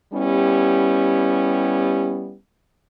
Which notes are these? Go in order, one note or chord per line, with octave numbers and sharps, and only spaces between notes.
G3 B3 C#4 E4 G4